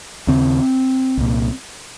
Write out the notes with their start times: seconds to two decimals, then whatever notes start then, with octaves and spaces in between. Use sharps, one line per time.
0.27 D#2 C#3 C4
1.18 C2 A#2